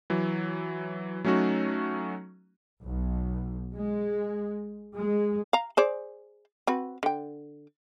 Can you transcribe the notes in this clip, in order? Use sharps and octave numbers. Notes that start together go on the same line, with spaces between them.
E3 F#3
F#3 A3 C#4 D#4 F#4
B1
G#3
G#3
F5 A#5
G#4 C5 D5
C4 F#4 B4
D3 G5